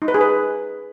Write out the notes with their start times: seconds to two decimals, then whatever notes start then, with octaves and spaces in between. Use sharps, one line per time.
0.02 D#4
0.08 B4
0.14 G#4
0.21 B4